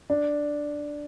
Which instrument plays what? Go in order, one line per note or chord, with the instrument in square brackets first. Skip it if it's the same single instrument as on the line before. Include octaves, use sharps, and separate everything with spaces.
[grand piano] D4